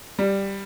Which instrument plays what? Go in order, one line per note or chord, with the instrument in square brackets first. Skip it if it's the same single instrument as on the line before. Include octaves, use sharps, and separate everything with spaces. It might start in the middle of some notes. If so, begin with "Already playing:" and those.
[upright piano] G3